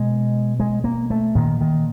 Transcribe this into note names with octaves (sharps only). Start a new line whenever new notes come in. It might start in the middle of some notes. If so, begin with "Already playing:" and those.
Already playing: B2 G#3
G#3
A#3
A3
A#2 D#3
D#3